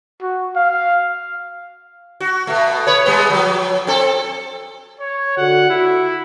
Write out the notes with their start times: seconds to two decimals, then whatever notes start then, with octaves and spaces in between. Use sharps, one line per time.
0.22 F#4
0.56 F5
2.20 F#4
2.47 B2 A3
2.87 B4 C#5
3.06 G3 G#3 B3
3.30 F3 F#3
3.87 C4 A4
5.00 C#5
5.37 D3 F#4 F#5
5.70 E4 F#4